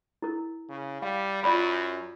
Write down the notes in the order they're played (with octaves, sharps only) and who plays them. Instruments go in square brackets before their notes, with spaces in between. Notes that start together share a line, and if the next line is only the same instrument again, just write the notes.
[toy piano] E4 A#4
[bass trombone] C#3
[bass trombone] G3 [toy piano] F5
[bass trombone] F#2 [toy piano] F4 D5 B5